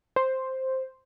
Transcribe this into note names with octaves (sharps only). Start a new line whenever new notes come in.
C5